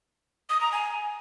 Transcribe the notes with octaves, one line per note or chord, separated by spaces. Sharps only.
D#6
A#5
G#5